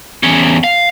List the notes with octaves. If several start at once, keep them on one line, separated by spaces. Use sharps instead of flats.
E2 C#4
F5